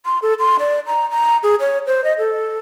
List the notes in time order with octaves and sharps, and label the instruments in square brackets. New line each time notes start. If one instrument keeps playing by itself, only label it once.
[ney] C6
A4
C6
D5
A#5
A#5
G#4
C#5
C5
D#5
A4